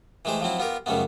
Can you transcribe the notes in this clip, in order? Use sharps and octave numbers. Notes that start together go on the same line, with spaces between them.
E3 G#3 A3 G4 C5
F3 F#3 C4 E4
B3 F4 G4 A#4
F#2 C#3 G3 A3 B3